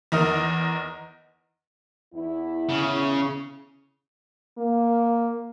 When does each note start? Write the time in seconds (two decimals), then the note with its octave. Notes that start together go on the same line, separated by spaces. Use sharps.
0.12 E2 D#4 A#4 D#5 F6
2.14 E2 E4
2.69 C#3
4.58 A#3